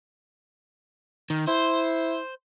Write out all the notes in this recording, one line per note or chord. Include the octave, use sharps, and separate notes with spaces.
D#3
E4 C5